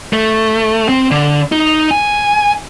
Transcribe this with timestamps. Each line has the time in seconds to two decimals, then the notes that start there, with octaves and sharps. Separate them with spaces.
0.13 A3
0.89 C4
1.11 D3
1.52 D#4
1.91 G#5